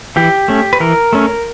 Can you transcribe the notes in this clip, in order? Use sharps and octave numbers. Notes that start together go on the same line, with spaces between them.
E3 G4
A3 C#4
B4
E3 A#4
A3 C#4